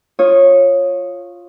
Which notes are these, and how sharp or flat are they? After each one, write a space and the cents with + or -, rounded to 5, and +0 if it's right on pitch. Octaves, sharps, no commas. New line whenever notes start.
F4 +0 C#5 -15 D#6 +0